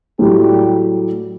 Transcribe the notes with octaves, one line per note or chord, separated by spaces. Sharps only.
A2 F#3 G3 A3 G4